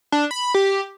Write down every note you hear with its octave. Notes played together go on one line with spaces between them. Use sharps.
D4
B5
G4